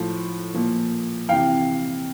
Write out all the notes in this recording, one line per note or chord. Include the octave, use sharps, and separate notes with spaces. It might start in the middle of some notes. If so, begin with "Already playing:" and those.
Already playing: A2 F3
A#2 F3
C3 E3 F5 G5